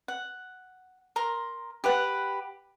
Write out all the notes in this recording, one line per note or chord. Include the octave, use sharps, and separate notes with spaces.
F#5
A#4 A#5 C6
G4 B4 F#5